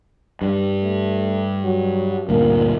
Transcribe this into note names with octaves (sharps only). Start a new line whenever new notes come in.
G2
A3
F#3
D2 G2 A#2 A#3